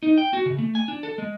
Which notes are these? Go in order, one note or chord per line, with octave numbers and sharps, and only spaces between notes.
D#4
G5
F#4
C#3
A3
G#5
D4
A4
G#3